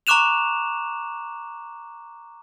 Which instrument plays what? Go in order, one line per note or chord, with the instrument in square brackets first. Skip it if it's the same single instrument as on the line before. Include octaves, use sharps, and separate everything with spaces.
[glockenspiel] A#5 C#6 D6 F#6 E7 F7